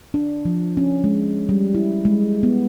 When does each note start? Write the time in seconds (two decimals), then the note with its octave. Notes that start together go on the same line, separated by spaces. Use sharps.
0.14 D4
0.45 F3
0.77 C#4
1.04 G#3
1.49 G3
1.75 E4
2.05 G#3
2.43 B3